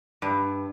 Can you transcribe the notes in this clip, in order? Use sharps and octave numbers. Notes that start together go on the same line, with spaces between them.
G2